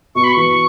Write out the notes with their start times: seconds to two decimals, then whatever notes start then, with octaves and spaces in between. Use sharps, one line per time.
0.15 B2 C#6
0.24 B5
0.33 E3 C#6